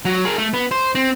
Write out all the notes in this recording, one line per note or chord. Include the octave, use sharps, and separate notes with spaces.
F#3
G#4 A#4
A3
B3
C5
C4